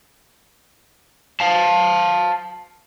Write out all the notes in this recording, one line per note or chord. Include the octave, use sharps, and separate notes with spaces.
F5 A5